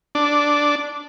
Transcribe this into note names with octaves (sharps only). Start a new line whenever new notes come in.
D4